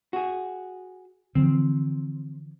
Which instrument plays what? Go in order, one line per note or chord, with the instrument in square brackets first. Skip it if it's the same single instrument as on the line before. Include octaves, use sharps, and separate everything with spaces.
[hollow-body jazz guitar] F#4 G#4
[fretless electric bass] D3 E3 F3 [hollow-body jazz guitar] C4